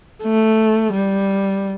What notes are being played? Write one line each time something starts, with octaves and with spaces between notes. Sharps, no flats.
A3
G3